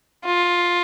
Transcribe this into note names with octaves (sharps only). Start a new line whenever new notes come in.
F4